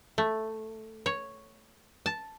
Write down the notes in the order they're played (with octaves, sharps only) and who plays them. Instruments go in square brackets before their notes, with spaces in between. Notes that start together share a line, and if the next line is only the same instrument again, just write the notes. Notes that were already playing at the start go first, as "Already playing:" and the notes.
[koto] A3
C#5
A5